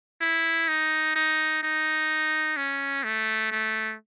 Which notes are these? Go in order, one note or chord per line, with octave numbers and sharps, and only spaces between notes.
E4
D#4
D#4
D#4
C#4
A3
A3